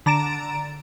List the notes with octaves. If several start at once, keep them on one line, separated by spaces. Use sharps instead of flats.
D3 A#5 A6 D7 E7